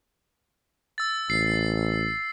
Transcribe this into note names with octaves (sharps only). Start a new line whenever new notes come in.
E6 A6
A1 C7